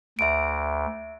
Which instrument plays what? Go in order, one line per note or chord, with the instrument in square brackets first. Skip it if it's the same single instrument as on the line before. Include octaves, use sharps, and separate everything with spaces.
[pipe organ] D2 [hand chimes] E5 D7